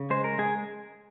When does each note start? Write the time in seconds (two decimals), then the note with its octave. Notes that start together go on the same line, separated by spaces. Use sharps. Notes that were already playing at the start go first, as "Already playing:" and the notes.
Already playing: C#3
0.10 G#3 C5
0.24 A#4
0.38 G#3 G#4